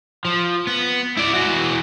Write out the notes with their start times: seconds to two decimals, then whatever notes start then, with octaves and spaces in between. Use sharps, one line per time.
0.25 F3
0.67 B3
1.17 E4 D5
1.34 E3 F#4